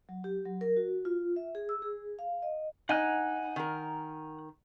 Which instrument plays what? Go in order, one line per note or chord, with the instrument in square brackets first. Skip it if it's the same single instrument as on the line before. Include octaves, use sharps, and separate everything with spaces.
[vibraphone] F#3
G4
F#3
A#4
F#4
F4
E5
G#4
E6
G#4
F5
D#5
[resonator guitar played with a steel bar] D#4 [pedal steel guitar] F#5 G#5 F#6
[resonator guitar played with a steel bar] D#3 A#4